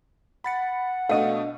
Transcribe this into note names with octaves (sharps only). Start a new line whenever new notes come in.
F#5 B5 A6 C#7
B2 A3 D4 D#5 F5